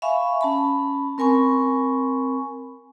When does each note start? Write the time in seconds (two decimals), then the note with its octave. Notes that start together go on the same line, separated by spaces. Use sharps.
0.02 E5 F5 G#5 B5 C#6
0.41 C#4 A5 B5
1.18 C4 A#4 G#5 B5 C#6